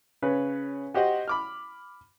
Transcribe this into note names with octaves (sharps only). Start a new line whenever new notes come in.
C#3 B4 C#5
F#4 G4 C5 D#5 F#5
B5 D6 F6